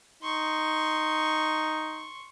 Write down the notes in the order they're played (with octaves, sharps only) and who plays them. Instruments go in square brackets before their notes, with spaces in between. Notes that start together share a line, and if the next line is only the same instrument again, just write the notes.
[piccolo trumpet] D#4 [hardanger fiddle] C6 C#6